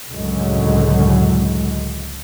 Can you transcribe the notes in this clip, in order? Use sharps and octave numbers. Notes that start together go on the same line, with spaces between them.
C#2 F#2 A2 D3 F#3 G#3